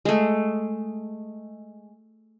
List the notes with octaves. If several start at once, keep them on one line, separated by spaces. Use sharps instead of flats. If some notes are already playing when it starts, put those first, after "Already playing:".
G#3 A3